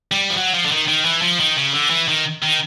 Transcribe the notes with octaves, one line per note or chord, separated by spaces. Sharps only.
G3
F3
F#3
F3
D3
D#3
D#3
E3
F3
D#3
C#3
D3
E3
D#3
D#3